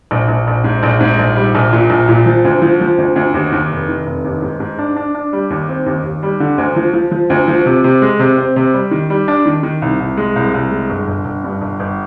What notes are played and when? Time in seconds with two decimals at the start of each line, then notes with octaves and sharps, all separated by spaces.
0.11 A#1
0.28 A#1
0.47 A#1
0.64 G#2
0.83 A#1
1.01 G#2
1.19 A#1
1.36 G3
1.55 A#1
1.73 A#2
1.90 A#1
2.09 A#2
2.26 F3
2.45 D2
2.62 F3
2.81 F3
2.98 D2
3.16 D2
3.34 D#2
3.52 D#2
3.71 F1
3.89 D#3
4.06 F1
4.25 D#2
4.42 G#2
4.60 G#2
4.79 D4
4.96 D4
5.15 D4
5.33 G3
5.50 D#2
5.69 C4
5.86 D#2
6.04 D#2
6.23 G3
6.40 D3
6.58 D2
6.76 F3
6.93 F3
7.12 F3
7.30 D2
7.48 F3
7.66 C3
7.84 C3
8.02 G#3
8.19 C3
8.37 C4
8.56 C3
8.74 G3
8.91 D#3
9.10 G3
9.28 D4
9.46 D#3
9.63 D#3
9.82 C2
10.00 C2
10.17 G#3
10.36 C2
10.54 C2
10.72 G#3
10.90 G1
11.08 G1
11.25 G1
11.44 G2
11.61 G1
11.80 G1